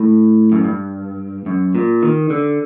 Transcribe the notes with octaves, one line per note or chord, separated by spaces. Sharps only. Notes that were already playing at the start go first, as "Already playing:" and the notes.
Already playing: A2
F#2
G2
F#2
A#2
D#3
D3